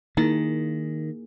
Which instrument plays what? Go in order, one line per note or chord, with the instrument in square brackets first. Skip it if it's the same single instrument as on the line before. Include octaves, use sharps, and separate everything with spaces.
[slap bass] D#3 [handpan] A#3 G#4 [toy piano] D#4 E4